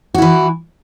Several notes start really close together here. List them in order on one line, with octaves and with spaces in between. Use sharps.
F#4 E4 E3